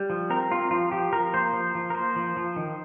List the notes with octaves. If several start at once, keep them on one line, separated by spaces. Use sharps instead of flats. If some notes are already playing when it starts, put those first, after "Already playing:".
Already playing: G3
F3
C4 A#4
C4 F4
F3 F4
F3 G4
F3 A#4
A#3 C5
F3
F3
A#4
A#3 C5
F3
F3
D#3